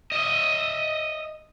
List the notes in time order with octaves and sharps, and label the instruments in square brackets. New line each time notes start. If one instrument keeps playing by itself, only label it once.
[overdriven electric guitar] D#5 E5